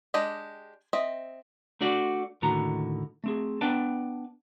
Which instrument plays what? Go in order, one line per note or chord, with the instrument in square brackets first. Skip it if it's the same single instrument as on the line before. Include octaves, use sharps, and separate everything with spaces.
[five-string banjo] G#3 D4 G4 D#5
C4 D#5 E5
[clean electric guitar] A3 D4 F#4 D5
D#2 A2 D3 D#3 F#4 A#5
A3 C4 G#4
B3 D4 B4 D5 G5 A5